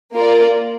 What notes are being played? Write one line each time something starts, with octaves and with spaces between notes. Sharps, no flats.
A#3 F4 A#4 D5